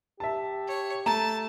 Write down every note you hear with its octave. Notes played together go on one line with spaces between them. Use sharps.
G4 E5 A5
C#5
A3 A5 A#5